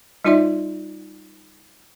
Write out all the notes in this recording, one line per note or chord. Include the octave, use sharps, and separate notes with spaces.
G3 D#4 F4 D5 E5 C6